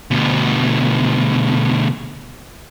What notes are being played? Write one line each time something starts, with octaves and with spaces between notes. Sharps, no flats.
D2 B2